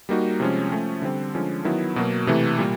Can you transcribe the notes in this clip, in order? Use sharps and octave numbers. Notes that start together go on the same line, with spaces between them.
G3 A#3 D#4 F#4
C3 F3 G#3 C#4
F3 A3 C#4
D3 G3 C4
D3 F3 G#3 C#4
D#3 F#3 B3 E4
B2 F#3 A#3
C3 E3 A3
A#2 G3 A#3